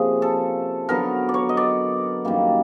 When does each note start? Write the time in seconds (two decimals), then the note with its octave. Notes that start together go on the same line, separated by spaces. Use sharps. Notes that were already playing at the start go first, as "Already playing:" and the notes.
Already playing: C3 F3 A#3 C#4 G#4
0.22 A4
0.89 D3 F#3 B3 A#4
1.29 D5
1.34 C#5
1.49 D#5
1.57 D5
2.25 F#2 D#3 G3 A#3